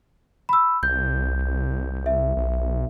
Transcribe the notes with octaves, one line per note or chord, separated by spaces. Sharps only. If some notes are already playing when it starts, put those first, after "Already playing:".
B5 E6
C2 G6
E5
B1